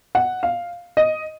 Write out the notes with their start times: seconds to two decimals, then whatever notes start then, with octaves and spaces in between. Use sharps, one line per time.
0.15 F#5
0.43 F5
0.97 D#5